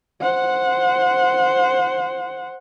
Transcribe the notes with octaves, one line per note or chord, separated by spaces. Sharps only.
C5 F#5